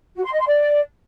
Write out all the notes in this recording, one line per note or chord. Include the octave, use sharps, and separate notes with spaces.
F#4
C6
D#5
C6
D5